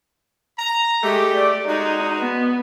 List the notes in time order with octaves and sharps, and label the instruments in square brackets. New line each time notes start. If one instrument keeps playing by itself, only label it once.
[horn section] A#5
[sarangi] G#3 [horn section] A3 G4
[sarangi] D5
[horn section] G#3 F#4 [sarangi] D#4
[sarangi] B3